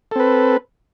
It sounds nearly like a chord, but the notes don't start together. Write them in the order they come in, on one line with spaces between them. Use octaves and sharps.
A4 C4 B4